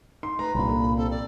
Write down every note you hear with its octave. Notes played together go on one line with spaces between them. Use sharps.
D#4 C6
A3 B4 A#5
C2 A#2 G3 D4 B5
A#3 A4
C4 A4
D5